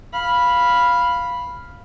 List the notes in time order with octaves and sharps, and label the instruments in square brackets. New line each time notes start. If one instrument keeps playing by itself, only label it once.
[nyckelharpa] F5 B5